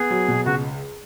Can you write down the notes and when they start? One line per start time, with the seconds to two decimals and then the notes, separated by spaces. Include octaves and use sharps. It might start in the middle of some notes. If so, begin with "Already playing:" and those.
Already playing: B3 G#4
0.10 F#3
0.28 B2
0.46 C#2 F#4